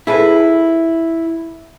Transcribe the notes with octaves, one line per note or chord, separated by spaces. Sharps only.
E4 G#4 A4 B4